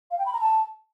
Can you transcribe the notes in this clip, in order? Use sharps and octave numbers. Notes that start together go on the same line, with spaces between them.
F5
G5
B5
A#5
A5